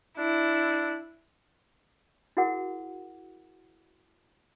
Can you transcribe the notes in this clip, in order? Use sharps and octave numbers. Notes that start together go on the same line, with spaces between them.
D4 E4
E4 F#4 G#4 A#4 F#5